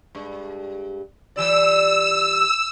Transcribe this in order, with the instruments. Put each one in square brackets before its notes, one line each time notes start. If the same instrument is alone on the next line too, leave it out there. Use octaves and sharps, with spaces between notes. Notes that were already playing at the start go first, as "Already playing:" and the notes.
[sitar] G2 G#3
[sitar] E3 G3 D5 [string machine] E6